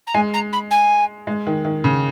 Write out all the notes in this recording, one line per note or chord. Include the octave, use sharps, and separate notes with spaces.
A#5
G#3 G#5
A#5
B5
G#5
G#3
D#3
D#3
C#3